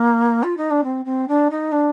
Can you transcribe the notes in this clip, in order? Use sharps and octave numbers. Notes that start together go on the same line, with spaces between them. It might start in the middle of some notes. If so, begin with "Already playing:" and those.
Already playing: A#3
F4
D#4
D4
C4
C4
D4
D#4
D4